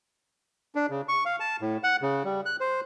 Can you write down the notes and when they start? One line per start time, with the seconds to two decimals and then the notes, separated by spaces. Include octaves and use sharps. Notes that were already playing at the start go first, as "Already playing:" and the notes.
0.75 D4
0.90 C#3
1.09 C#6
1.25 F5
1.40 A5
1.61 A2
1.84 F#5
2.02 C#3
2.24 G3
2.46 F#6
2.60 C5